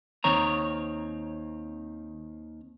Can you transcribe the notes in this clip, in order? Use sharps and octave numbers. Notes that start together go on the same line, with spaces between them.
D#2 D#3 C4 C#5 A#5